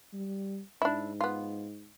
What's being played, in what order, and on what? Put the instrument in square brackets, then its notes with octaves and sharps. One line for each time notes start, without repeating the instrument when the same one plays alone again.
[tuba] G3
[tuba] G#2 [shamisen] D4 E4
[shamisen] B3 F4